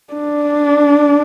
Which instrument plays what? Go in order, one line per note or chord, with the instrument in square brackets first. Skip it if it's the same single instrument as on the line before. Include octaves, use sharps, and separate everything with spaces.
[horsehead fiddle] D4